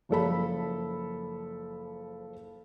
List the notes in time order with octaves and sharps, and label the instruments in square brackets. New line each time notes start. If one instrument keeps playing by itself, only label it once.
[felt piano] F#1 F3 A4 B5